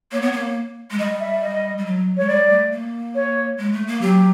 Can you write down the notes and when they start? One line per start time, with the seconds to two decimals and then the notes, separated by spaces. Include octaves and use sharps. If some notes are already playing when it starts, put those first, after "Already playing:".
0.12 A#3 C#5
0.21 B3
0.32 A#3
0.91 G#3
0.99 G3 D#5
1.20 E5
1.42 D#5
1.78 G3
1.86 F#3
2.17 G#3 C#5
2.28 G3 D5
2.50 A3
2.71 A#3
3.15 C#5
3.58 G#3
3.73 A3
3.87 A#3
4.01 F#3 G4